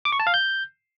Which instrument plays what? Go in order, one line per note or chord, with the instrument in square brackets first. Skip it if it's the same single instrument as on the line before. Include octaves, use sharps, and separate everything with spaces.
[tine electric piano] D6
C#6
A5
F5
G6